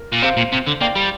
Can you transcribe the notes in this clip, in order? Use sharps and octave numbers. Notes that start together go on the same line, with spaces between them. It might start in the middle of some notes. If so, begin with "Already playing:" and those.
Already playing: A#4
A#2
C3 C5 F5
A#2
C3
D3
A#3 D5 G5
G3